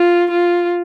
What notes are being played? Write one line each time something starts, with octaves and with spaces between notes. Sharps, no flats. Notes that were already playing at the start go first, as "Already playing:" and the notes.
Already playing: F4
F4